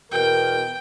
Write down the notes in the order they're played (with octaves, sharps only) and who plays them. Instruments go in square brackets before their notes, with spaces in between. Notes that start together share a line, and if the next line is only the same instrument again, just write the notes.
[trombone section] E2 B2 A#4 [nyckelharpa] G5